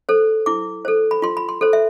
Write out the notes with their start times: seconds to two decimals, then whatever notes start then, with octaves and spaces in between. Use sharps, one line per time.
0.09 A4 C5
0.46 E4 D6
0.85 A4 C5
1.11 B5
1.22 F4 C6
1.37 B5
1.49 C6
1.61 A4 C5
1.73 E5